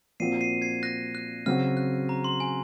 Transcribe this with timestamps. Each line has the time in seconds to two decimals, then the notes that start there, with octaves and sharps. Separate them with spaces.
0.20 A#2 F3 C4 F#4 C7 D#7
0.41 C7 D#7
0.62 G#6 C7
0.83 F#6 A#6
1.15 F#6
1.46 C#3 F#3 C4 F#4 F6
1.77 F#6
2.09 A#5
2.24 C6
2.40 G#5